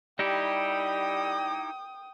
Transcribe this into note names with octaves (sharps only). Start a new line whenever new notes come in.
G3 D#4 E4 G4 G5 D#6